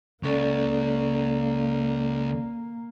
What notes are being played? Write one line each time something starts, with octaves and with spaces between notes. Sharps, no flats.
C#2 A#3 C#4 A4 D5